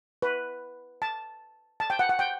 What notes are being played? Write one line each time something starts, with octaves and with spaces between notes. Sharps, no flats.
B4
A5
A5
G5
F#5
F#5
G5